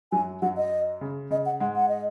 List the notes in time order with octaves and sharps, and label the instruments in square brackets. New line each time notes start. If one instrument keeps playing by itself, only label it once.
[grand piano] F#2 F#3 [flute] G#5
[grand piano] F#2 F#3 [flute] F#5
[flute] D#5
[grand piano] C#3
[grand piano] C#3 [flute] D#5
[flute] F#5
[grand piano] G#2 G#3 [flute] F#5
[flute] F#5
D#5